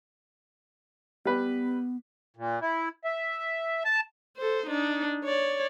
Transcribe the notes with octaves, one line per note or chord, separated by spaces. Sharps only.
G3 B3 B4
A#2
E4
E5
A5
A4 C5
D4 D#4
C#5 D5